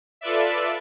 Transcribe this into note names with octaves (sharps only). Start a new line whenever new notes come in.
F4 A4 B4 D5 E5